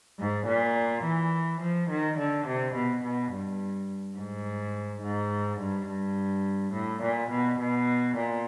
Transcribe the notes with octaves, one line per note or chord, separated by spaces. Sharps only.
G#2
A#2
E3
F3
D#3
D3
C3
B2
B2
G2
G#2
G#2
G2
G2
A2
A#2
B2
B2
A#2